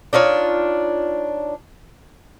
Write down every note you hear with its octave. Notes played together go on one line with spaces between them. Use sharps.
D4 D#4 F4 C#5